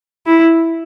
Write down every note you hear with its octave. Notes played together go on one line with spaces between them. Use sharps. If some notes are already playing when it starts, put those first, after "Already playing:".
E4